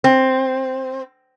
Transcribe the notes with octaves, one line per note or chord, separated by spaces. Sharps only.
C4